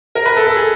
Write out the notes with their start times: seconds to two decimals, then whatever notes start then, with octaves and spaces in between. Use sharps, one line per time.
0.15 A#4
0.25 B4
0.36 A4
0.47 A4
0.56 G#4